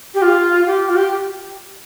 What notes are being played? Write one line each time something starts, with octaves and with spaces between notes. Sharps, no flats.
G4
F4
G4
F4
G4